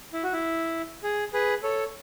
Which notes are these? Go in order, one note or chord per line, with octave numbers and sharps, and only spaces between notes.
E4
F#4
E4
G#4
G#4 B4
A4 C#5